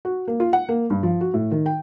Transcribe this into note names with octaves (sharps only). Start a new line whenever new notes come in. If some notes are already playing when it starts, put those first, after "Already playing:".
F#4
A#3
F4
F#5
A#3
G2
F3
F#4
A2
D#3
G5